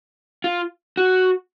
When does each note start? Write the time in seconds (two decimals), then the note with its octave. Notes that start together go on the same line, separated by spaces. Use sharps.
0.44 F4
0.97 F#4